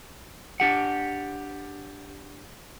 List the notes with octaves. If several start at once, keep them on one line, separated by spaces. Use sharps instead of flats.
D4 G4 F#5